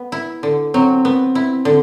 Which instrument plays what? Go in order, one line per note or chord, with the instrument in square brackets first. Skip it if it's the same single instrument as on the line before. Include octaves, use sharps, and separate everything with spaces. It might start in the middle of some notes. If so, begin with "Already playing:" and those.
Already playing: [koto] B3
E4
D3
[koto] F#3 [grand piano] C4
[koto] B3
E4
D3